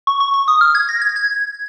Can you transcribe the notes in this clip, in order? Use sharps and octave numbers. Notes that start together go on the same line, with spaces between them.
C#6
C#6
C#6
D#6
F6
G#6
A#6
G#6
G#6